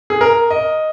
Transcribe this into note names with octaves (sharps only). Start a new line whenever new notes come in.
G#4
A#4
D#5